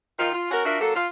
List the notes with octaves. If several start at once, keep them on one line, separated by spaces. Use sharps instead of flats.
D#3 F4
F4
C#4 F#4 A#4
D4 F4 F#4 A#4 E5
F#3 A#3 A4
F4